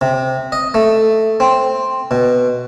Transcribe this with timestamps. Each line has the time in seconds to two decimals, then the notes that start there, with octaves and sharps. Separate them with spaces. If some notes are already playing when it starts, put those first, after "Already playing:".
0.01 C3
0.52 D#5
0.74 A3
1.40 C4
2.11 B2